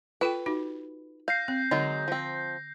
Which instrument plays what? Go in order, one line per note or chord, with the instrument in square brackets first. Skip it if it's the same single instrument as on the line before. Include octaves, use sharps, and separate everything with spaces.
[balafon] F4 A4 G5 [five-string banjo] B4
[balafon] D#4 F#4
[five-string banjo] F5 [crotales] G6 A#6 C7
[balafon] C4
[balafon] D3 [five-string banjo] F#3 G#3 D#4
[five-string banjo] F3 C4